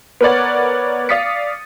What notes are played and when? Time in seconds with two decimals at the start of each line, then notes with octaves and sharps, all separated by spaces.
0.21 B3 A#4 B4 C#5 D5 F#5
1.09 D5 F5 D#6 A6 B6 C#7